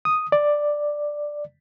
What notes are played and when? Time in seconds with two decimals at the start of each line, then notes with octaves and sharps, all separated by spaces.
0.05 D#6
0.32 D5